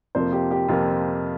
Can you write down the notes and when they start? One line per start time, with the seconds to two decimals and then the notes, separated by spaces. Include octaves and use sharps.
0.15 F2 C3 F3 A#3 C5
0.33 G4
0.51 G4
0.68 F2 C3 F3 A#3 F4